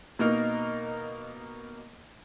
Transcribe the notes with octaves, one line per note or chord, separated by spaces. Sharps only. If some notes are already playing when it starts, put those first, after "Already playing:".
B2 A#3 D#4 A#4